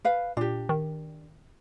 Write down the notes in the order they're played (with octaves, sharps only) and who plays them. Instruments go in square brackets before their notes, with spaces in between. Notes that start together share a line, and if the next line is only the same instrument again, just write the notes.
[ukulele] B4 F5
[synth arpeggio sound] A#2 [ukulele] D4 G4
[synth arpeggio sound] D#3